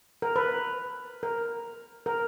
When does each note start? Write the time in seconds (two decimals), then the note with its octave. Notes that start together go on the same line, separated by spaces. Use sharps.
0.22 A#4
0.36 B4
1.23 A#4
2.06 A#4